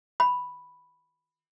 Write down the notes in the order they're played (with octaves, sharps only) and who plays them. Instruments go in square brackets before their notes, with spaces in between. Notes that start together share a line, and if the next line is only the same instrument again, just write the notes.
[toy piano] B5